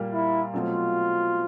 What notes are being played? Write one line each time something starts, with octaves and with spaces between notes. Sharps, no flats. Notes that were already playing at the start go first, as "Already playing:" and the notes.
Already playing: A#2 G3 A#3
E4
B2 F#3 A3 C4 F4